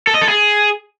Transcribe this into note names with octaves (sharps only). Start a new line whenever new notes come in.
A4
D#5
A4
G#4